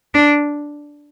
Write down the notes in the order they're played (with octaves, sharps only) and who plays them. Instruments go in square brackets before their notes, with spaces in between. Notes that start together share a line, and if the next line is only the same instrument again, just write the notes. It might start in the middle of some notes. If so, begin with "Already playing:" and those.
[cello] D4